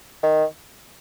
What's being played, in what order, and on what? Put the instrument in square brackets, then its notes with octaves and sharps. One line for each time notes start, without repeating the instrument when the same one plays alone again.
[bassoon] D#3